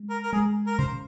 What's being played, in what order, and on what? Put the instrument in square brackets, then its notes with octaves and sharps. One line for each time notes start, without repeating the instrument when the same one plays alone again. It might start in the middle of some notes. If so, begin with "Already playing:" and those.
Already playing: [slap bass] G#3
[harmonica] A#4
A#4
[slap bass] G#3 [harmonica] G#4
[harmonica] A#4
[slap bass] C#3 [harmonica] C5